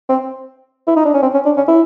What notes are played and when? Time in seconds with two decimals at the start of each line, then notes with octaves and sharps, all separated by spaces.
0.09 C4
0.88 E4
0.96 D#4
1.05 D4
1.14 C#4
1.22 C4
1.34 C#4
1.45 D4
1.57 C#4
1.68 E4